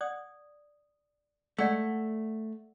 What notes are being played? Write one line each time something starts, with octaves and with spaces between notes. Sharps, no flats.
D5 F#5 D#6
G#3 A3 D5 F#5 E6 C#7